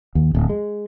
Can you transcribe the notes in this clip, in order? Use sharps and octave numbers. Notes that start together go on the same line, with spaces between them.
D#2
D1
G#3